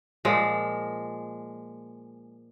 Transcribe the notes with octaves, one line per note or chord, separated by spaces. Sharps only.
A#2 F3 G#3